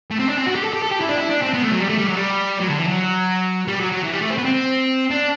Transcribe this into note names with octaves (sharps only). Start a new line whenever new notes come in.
A3
C4
D4
C4
F#4
G4
A4
G4
A4
G4
E4
D4
E4
D4
C4
B3
A3
F#3
G3
A3
G3
F#3
G3
F#3
D3
E3
F#3
G3
F#3
F#3
E3
G3
A3
C4
B3
C4
D4